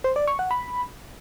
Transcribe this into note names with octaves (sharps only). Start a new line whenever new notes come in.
C5
D5
C#6
F#5
B5